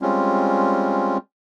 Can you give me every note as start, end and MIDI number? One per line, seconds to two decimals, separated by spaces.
0.02 1.17 55
0.02 1.17 56
0.02 1.17 60
0.02 1.17 61
0.02 1.17 65